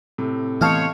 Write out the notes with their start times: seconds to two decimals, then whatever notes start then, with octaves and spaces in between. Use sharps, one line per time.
0.18 A2 C3
0.61 E3 A3 B3 C5 C#5 D#5 F5 A5